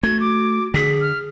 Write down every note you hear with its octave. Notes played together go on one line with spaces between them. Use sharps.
A3 F#4 G#6
D6
D3 G#4 B6
F6